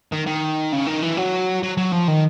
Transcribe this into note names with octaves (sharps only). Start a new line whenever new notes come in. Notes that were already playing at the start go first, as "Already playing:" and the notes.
D#3
D#3
C#3
D#3
E3
F#3
F#3
F#3
F3
D#3